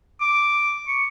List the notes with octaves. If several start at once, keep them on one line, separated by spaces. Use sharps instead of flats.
D6
C#6